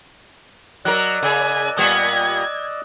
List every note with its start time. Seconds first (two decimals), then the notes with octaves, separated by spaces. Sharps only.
0.85 F#3 A#4 D5 D#5 E6 F#6
1.22 C#3 G#5
1.77 A#2 G3 B3 D#6 G#6